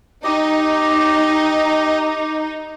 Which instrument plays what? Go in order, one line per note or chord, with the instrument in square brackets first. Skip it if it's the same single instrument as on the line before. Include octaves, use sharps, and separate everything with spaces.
[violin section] D#4 [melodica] G4 D#5